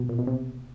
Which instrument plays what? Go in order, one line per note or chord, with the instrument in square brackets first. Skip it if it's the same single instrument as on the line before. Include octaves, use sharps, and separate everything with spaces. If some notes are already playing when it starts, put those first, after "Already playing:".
Already playing: [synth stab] B2
A#2
B2
C3